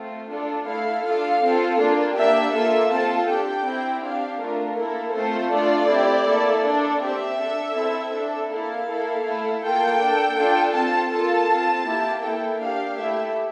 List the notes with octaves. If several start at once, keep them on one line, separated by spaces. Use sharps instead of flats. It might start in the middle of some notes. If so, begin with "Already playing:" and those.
Already playing: A3 C4 F4
D4 F4 A4
A3 E4 A4 F5
D4 F4 A4 F5
C4 F4 A4
A#3 D4 F4
A#3 D4 G4 E5
A#3 F4 A4 E5
C4 F4 A4 A5
D4 G4 G5
C4 E4 G4
D4 G4 F5
A3 D4 F4 A#4
A#3 E4 A4 A#4
A3 C4 F4 A4 C5
A3 D4 F4 A4 D5
C4 E4 G4
A#3 E4 A4
D4 A4
C4 G4 E5
D4 A4
C4 E4 A4
D4 A4
A#3 E4 A4 F5
A#3 E4 A4
A3 E4 A4
A#3 F4 A4 G5
D4 A4
D4 F4 A4
C4 F4 A4 A5
A#3 F4 A4 A5
C4 F4 A4
A#3 E4 G4
A#3 E4 A4 G5
D4 G4 F5
A3 E4 G4 E5